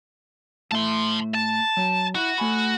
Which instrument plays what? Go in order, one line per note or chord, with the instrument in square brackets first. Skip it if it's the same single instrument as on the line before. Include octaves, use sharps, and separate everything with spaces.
[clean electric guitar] A2 A3 E5 [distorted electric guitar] A5 C6
[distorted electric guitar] A5
[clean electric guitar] F#3
[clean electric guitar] E4 [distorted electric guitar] F#4
[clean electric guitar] A3 G#5 B5